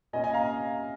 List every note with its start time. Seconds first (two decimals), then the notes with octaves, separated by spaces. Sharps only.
0.13 A#2 A#3 C#4 D#5 G#5
0.24 D#5 G#5
0.34 F5 A#5